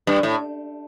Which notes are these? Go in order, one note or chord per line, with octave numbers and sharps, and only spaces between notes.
G2
A2